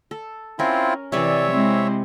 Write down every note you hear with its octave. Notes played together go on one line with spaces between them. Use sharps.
A4
C4 C#4 E4 F4 A#4
C3 E3 C#5 D5 E5 G#5
G#3 C4 E4